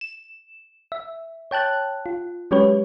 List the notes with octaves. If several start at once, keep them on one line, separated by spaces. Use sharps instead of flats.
E7
E5
C#5 G5 A5 F#6
F4
F#3 G#3 C#4 G4 B4 C#5